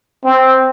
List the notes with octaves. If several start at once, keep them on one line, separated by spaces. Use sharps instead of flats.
C4